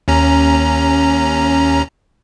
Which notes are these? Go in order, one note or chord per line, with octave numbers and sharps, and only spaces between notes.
D#2 C#4 A#5